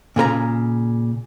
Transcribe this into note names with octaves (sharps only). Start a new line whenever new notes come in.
A#2 C#3 A#4 A#5